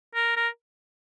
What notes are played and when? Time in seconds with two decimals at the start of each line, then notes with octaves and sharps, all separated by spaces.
0.15 A#4
0.37 A#4